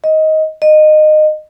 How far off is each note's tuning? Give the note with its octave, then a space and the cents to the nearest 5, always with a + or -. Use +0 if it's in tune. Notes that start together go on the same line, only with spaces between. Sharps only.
D#5 +15
D#5 -20